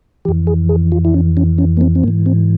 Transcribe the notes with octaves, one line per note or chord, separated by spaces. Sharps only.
F2 E3 G4
G#4
G#4
F4
E4
C#4
C#4
C#4
A#3
C4
C4
G#2 E3 A#3
C4